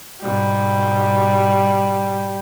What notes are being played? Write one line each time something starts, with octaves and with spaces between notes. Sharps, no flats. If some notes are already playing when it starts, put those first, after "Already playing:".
G#2 B2 G3